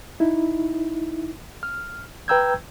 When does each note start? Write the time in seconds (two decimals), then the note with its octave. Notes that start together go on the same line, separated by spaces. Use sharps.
0.20 D#4 E4
1.63 F6
2.28 B4 G5 A#5 E6 G6 G#6